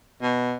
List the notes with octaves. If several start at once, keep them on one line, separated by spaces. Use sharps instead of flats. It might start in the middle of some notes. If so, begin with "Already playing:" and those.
B2